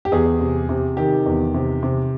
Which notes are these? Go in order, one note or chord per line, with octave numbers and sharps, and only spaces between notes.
G4
E2 G#4
C3
C3
D#3 G4
E2
C3
C3